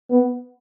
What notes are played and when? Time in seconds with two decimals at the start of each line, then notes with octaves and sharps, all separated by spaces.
0.10 B3